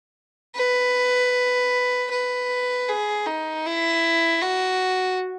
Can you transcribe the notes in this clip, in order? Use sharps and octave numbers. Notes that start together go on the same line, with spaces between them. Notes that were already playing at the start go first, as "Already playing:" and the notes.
B4
B4
G#4
D#4
E4
F#4